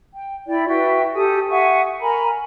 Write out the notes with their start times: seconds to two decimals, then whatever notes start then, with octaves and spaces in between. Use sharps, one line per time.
0.14 G5
0.47 E4 D5 G5
0.68 F#4 B4 E5 G5
1.15 G4 A4 G#5 D#6
1.49 E5 F#5 G#5 C#6
2.01 A#4 G#5 A#5 B5